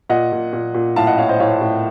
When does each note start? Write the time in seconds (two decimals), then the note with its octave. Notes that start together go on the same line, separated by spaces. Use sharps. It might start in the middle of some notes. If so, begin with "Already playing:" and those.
0.10 A#2 D#5 F#5
0.32 A#2
0.53 A#2
0.74 A#2
0.96 A2 F5 A5
1.07 D#5 F#5
1.18 A2 C#5 F5
1.29 C5 D#5
1.40 A2 C#5 F5
1.61 A2